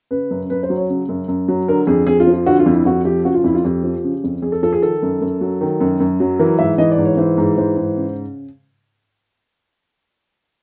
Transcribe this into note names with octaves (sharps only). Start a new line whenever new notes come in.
C#3 B4
F#2
F#2 B4
C5
F#3
C#5
C#3
F#2
F#2
F#3
D3 A#4
F2 G#4
F2 G#4
F4
F3
F4
D3 F#4
F4
F2
E4
F2 F#4
F3 G4
C#3 F#4
F4
F2 E4
F4
F2 G4
F3
C#3
F2
F2 G#4
A4
F3 A4
G#4
D#3 A4
F#2
F#2
F#3
D#3
F#2
F#2
F#3
E3 A#4
G#2 E5
E3 D#5
D5
G#2
C#5
E3 C5
G#2
E3 C5
G#2
C#3